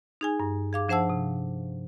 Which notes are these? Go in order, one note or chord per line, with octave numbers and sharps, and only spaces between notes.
D#4 G#4 G#5
G2
G#4 F5 D6
F3 D4 C5 F#5 A5 E6
C3